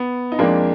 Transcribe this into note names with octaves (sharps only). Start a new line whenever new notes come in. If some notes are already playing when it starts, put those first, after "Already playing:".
Already playing: B3
D#4
F2 F3 G#3 A#3 D4